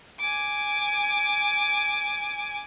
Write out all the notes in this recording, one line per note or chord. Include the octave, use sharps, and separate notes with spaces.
G#5 D6